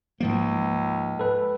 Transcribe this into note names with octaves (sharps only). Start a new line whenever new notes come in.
C#2 G#2 F3 A#3
A4 B4